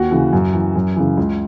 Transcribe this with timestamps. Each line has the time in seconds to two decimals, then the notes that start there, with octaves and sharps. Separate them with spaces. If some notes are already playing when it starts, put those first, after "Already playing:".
Already playing: D#2 F#4
0.11 C#3 E3
0.33 F#2
0.54 E3
0.75 F#2
0.96 C#3 E3
1.17 C#2